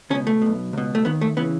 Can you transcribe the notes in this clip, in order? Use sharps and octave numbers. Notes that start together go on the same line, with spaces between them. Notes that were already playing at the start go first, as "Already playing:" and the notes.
C#2 B2 C#4
A3
B1 B2
C#2 B2
A3
D#2 D#3 B3
A3
C#3 E3 B3